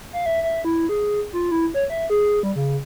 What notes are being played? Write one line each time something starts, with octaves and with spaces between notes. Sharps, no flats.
F5
E5
E5
E4
G#4
F4
E4
C#5
E5
G#4
G3
C#3